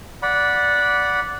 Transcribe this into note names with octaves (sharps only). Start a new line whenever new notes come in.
D5 F#5 B5